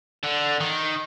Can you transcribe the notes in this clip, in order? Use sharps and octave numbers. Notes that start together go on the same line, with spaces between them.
D3
D#3